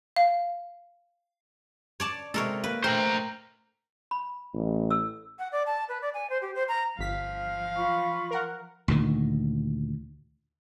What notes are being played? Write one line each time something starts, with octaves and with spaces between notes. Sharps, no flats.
F5
C#5 D5 A5
C3 G#3 A4 A#4 C#5
A#3 B4
A3 A#4 C5 G5 A#5 F#7
B5
A1
A4 E6
F#5
D5
A5
B4
D5
G#5
C5
G4
C5
A#5
G1 F3 F5 B6
F4 B5 C#6
A#4 F#5
D2 A#2 D#3